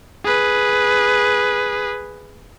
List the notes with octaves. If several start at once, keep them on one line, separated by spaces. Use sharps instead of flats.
G#4 B4